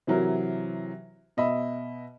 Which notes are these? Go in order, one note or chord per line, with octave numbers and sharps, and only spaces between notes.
C3 E3 F#3 A#4
B2 D#5 E5 B5